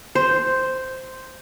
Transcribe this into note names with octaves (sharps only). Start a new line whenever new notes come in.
C5